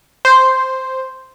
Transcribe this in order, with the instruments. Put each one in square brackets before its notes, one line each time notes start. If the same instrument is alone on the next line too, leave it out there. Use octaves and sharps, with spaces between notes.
[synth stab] C5